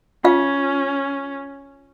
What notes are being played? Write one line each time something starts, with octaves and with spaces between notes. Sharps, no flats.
C#4 F4 F5